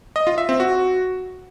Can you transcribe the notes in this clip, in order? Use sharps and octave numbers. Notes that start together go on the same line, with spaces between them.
D#5
F4
E5
C4
F#4